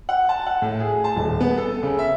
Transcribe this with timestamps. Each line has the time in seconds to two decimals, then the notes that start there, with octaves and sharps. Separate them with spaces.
0.09 F#5
0.29 A5
0.47 F#5
0.62 A2
0.80 G#4
1.04 A5
1.16 D#1
1.40 B3
1.58 A4
1.83 C#3
1.99 E5